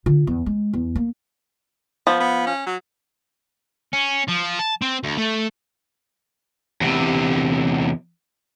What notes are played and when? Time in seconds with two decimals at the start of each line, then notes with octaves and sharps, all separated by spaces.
0.06 D3 F4
0.27 E2
0.46 G#3
0.73 E2
0.96 A#3
2.07 F3 B3
2.20 B3
2.47 C#4
2.67 F#3
3.93 C#4
4.28 F3
4.59 A5
4.82 C4
5.03 D2
5.17 A3
6.81 E2 C3